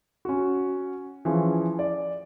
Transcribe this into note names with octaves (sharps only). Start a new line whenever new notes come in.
C#4 F#4
E3 F3 C#4 G#4
D5